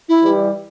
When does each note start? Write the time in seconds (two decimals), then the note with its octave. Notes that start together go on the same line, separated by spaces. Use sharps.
0.09 E4
0.23 E3 G3